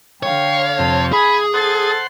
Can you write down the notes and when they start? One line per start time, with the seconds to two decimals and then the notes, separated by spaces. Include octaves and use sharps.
0.23 D3 C#5 F5 G5
0.79 F2 C3 C4 A5
1.13 G#4 G#5 B5
1.54 A4 C5 F#5 C6 A6